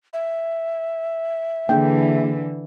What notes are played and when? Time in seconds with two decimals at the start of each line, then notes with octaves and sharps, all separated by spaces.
0.13 E5
1.69 D3 E3 A#3 D4 G#4 G5